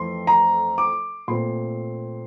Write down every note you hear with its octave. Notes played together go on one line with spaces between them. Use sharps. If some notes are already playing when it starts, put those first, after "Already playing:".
Already playing: F2 E3 A3 C4 C6
A#5
D6
A#2 A3 C4 C6